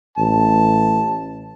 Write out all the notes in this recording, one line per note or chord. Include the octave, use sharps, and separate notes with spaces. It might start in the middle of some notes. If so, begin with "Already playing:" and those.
A1 A5